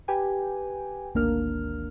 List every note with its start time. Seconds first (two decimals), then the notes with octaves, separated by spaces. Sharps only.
0.08 G4 B4 G5 G#5
1.14 G#1 D2 A#3 D4 A#4 F6